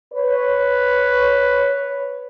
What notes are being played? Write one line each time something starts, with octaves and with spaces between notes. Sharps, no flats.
B4 C#5